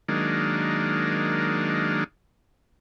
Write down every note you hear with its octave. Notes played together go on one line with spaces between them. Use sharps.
D#3 F#3 G#3 A#3 D4